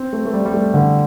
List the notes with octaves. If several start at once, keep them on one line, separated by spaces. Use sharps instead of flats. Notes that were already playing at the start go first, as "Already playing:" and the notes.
Already playing: C4
A3
A3
G3
G3
A3
D3